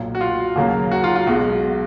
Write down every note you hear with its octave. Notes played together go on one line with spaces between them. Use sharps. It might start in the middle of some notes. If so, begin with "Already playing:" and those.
Already playing: B1 A#2 F#3
F#4
F4
D#2 C#3 F#3 A#3
F#4
F4
F4
B1 B2 G#3 F#4